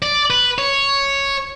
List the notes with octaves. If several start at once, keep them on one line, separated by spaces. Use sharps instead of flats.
D5
B4
C#5